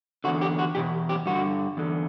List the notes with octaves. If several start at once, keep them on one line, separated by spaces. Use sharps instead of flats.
E2 D3 F#4
G4
F#4
E2 B2 G4
G4
G2 D3 F#4
E2 D3